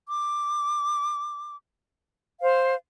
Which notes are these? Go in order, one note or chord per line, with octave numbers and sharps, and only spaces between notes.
D6
C5 F5